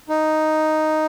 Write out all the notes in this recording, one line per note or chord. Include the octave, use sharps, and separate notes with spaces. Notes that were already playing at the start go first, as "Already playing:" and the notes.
D#4